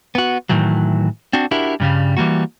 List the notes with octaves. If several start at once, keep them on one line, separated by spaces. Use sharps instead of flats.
B3 F#4
A2 D#3 E3 F#3
C4 D4 F#4
D4 E4 F#4 G4 A#4
G2 C#3 G3
E3 G3 A#3 F#4